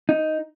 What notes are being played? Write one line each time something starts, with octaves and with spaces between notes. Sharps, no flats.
D#4